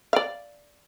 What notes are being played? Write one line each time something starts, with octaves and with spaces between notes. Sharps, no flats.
D5 F5